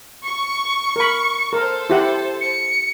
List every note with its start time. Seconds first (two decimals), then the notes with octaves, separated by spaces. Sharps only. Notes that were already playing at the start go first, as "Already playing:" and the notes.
0.24 C#6
0.96 A#4 B5
1.53 A4 A#4 C5
1.90 E4 G4 F#5
2.41 C#7